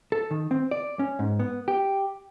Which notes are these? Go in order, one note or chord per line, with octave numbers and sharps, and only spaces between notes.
A4
D#3
C4
D5
C#4
G#2
B3
G4